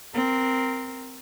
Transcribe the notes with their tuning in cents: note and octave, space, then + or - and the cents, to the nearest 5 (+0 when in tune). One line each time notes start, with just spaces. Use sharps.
C4 -5 A#4 +0